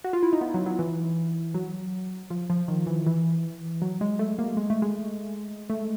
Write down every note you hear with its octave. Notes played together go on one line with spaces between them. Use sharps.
F#4
F4
E4
D#4
B3
F#3
F#3
E3
F#3
F3
F3
D#3
E3
E3
F#3
G#3
A3
A#3
G#3
A3
G#3
A3